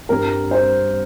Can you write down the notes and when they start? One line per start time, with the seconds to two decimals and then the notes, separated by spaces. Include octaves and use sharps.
0.09 G2 G3 C4 A#4
0.51 C5